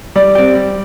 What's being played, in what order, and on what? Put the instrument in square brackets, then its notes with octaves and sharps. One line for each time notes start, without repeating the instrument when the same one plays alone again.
[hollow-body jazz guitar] G3 [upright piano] D5
[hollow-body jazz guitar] C4 G4
G3